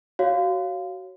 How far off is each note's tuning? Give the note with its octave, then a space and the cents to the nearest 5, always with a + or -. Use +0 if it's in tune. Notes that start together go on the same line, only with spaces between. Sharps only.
F#4 +20 C#5 +0 F5 +0